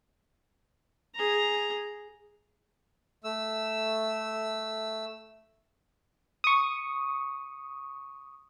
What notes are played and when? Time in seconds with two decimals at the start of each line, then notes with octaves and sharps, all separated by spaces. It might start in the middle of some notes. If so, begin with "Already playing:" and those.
1.15 G#4 A#5
3.24 A3 E6
6.44 C#6 D#6